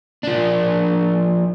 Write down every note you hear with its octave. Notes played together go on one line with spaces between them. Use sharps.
F3 D4